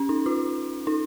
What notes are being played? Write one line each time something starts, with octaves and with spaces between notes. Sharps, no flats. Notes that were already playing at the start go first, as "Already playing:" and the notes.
Already playing: C#4
D#4
F4
D#4